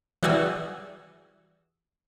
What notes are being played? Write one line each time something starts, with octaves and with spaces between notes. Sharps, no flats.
E3 G3 F#4 G#4 E6